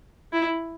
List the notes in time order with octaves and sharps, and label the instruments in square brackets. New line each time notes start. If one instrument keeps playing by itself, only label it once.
[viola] E4